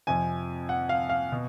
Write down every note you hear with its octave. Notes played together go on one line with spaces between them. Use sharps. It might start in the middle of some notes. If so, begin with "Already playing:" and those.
F2 C3 F3 G#5
F#5
F5
F5
B2